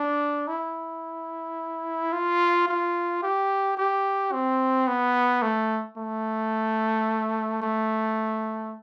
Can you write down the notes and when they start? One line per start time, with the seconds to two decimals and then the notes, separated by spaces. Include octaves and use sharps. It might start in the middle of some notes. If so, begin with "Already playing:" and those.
Already playing: D4
0.47 E4
2.12 F4
2.68 F4
3.23 G4
3.77 G4
4.33 C4
4.87 B3
5.42 A3
5.97 A3
7.62 A3